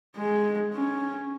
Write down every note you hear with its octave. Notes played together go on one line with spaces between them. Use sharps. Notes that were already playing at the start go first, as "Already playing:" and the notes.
G#3
C#4